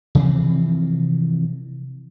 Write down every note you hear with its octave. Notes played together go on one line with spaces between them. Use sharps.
C3 E3 F3 C4